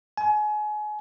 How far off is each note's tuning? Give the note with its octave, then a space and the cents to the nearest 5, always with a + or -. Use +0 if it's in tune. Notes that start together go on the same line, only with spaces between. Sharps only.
G#5 +30